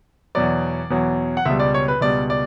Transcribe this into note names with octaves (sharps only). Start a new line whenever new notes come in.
E2 B2 F#3 D5
E2 B2 F#3
F#5
C#2 B2 G3 E5
D5
C#5
B4
C#2 B2 G3 D5
D5